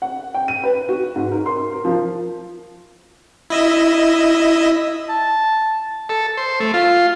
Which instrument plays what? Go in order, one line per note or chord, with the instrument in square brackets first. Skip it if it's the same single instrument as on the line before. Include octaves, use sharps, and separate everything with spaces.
[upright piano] F#5
G5
D#7
B4
F#4
G#2
A#4
C6
A#4
F3
[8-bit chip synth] E4 D#5 E5
[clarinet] A5
[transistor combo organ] A4
C5
A3
F4